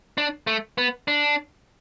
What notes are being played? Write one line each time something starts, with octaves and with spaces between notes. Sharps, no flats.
D4
A3
B3
D4